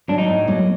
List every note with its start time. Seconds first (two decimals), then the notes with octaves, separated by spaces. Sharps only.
0.08 F#3 A#3 D4
0.18 D#4
0.29 A2
0.47 F#3 A#3